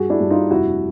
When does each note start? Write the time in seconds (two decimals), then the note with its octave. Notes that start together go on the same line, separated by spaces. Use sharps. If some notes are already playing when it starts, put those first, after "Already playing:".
Already playing: G2 F#4 G#4
0.10 D4 E4
0.20 G2
0.30 D#4 F4
0.50 F1 E4 F#4